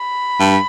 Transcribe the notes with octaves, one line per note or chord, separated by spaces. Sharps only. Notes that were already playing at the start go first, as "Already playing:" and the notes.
Already playing: B5
G2